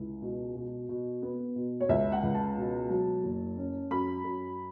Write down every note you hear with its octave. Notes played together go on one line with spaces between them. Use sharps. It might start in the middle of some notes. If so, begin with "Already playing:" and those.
Already playing: C#2 E4
B2
B2
B2
B3
B2
C#5
C#2 E5
F#5
C#2
A5
B2
F#3
F#1
C#4
F#2 B5
F#2